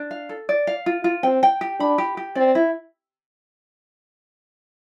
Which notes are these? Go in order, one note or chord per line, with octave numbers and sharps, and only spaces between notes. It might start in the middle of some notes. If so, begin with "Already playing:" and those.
Already playing: D4
F5
A4
D5
F5
F4
F4
C4 G5
G5
G4
D4 B5
G4
G4
C4 D5
E4